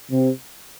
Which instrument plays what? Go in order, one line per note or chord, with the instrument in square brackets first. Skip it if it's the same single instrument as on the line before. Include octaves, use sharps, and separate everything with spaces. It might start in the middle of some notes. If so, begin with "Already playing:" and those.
[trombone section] C3